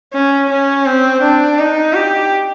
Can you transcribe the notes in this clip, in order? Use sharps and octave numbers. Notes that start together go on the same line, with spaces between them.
C#4
C#4
C4
D4
D#4
G4